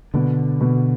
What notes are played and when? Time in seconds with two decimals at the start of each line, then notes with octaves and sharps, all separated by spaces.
0.14 B2 D3
0.61 B2